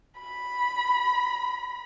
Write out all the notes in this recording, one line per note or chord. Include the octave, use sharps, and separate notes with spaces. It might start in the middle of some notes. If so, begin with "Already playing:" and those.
B5